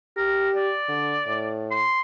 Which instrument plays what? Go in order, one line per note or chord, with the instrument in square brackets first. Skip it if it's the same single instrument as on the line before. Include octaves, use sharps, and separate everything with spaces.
[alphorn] G4 [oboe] A#4
[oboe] D5
[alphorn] D3
A2
[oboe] C6